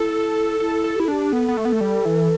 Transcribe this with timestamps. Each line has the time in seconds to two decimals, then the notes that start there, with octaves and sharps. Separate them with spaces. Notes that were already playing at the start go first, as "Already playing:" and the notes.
Already playing: E4 A4
0.60 E4 A4
0.84 A4
0.96 G4
1.00 E4
1.05 A4
1.08 D4 G4
1.32 B3 A4
1.48 B3
1.57 A3
1.65 B3
1.72 A3
1.81 G3
2.05 E3